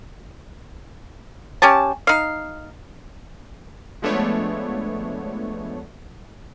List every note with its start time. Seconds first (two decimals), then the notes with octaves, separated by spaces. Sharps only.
1.62 C#4 G4 G#5 A5
2.07 D#4 F5
4.02 F3 G#3 A3 B3 D4 C#5